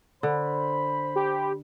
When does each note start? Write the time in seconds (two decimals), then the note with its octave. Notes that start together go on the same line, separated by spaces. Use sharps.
0.23 D3 C5 B5
1.16 G4